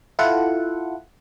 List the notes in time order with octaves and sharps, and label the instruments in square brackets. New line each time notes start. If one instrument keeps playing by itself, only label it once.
[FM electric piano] E4 F4 A4 F#5